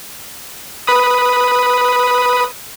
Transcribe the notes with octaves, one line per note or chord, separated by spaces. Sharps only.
B4 B5 D#6